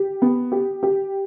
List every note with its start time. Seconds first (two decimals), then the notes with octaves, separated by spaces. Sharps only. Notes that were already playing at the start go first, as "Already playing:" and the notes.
Already playing: G4
0.22 B3
0.52 G4
0.83 G4